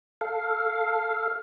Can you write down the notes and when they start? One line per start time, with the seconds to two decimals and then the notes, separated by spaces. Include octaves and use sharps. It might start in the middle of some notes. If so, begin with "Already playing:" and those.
0.21 A4 F5